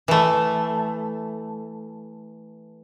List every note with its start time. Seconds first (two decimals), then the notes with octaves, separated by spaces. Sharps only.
0.08 E3 A3